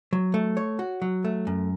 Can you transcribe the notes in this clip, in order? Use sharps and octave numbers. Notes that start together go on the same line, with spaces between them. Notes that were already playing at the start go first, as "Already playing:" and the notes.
F#3
A3
C#5
F#4
F#3
A3
F#2